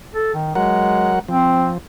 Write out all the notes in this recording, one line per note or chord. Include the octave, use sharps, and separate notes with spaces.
A4
D#3
F#3 G#3 A#4 F#5
F3 C4